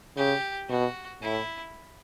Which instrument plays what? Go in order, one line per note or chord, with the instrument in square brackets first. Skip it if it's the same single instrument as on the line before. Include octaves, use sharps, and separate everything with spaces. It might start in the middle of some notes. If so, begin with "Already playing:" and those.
[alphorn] C#3 [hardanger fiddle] G4
[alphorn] B2 [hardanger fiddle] F#4
[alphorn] A2 [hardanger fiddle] E4